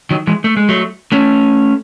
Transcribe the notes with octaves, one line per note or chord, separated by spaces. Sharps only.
D#3 F#3
E3 G#3
A3
G#3
F#3 A3
A3 C#4